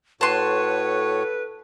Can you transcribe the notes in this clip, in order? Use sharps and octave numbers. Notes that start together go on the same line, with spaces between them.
A2 F#4 A4 B4 C#5 A5 C6